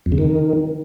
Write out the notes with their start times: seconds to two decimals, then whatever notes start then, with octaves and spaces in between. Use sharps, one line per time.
0.06 F2
0.12 C#3
0.18 D#3